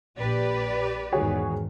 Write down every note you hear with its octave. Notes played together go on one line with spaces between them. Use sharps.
A#1 G4 B4 D5
E2 G#2 D#3 F#4 G#4 C#5